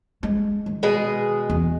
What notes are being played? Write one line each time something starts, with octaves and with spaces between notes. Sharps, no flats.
G#3
D#3
B2 G#3 G#4
E2